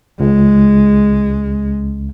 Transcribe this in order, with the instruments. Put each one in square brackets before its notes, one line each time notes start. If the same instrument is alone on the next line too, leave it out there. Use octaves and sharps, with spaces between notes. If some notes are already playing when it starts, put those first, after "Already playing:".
[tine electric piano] C#2 [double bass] G#3